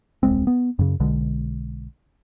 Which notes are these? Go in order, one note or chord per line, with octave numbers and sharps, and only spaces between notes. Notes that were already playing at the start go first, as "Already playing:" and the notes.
D#1 C2 G#3 C4
B3
F#2 C#3
B1 B2 D3 G#3